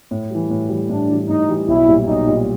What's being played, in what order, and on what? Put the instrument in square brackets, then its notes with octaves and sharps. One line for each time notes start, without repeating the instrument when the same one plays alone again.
[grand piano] A2
E3 G3
A2
E3 G3
[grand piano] A2 [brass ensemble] D4
[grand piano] E3 G3
[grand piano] A2 [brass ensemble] D#4
[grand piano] E3 G3
[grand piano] B1 [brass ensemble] E4
[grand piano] A#2 G3
[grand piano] B1 [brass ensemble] D#4
[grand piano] A#2 G3